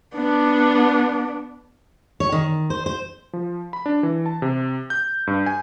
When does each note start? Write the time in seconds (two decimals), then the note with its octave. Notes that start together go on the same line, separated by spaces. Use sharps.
0.15 B3 D4
2.20 C#5
2.32 D#3
2.70 C5
2.86 C5
3.33 F3
3.73 B5
3.86 D4
4.03 E3
4.26 A5
4.42 C3
4.90 G6
5.27 G2
5.46 G#5